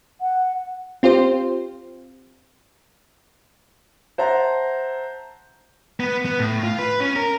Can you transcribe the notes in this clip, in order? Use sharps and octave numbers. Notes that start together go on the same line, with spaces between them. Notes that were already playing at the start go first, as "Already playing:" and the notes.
F#5
C4 F4 G4 C5
C5 E5 F#5 A5 A#5
B3
B3
A2
F4
B4
C#4
A#4